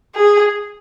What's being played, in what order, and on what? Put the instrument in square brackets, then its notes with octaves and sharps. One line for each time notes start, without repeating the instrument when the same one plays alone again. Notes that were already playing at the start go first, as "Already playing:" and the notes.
[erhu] G#4